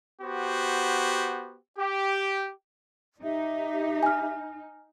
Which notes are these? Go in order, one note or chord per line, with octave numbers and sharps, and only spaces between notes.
B3 F#4 G4 C5
G4
D#4 G4 E5
G#5 F6